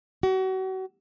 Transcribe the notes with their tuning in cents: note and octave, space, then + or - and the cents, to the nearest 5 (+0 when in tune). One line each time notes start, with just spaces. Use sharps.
F#4 +35